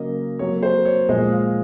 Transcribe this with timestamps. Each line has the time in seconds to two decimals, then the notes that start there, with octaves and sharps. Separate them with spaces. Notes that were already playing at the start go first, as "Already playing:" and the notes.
Already playing: C#3 F#3 A#3 D#5
0.39 C3 F#3 A#3 C#5
0.63 C5
0.85 C#5
1.09 A#2 F3 G#3 D#5
1.32 F5